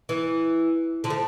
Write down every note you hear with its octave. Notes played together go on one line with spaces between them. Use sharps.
E3
D3 F3
A3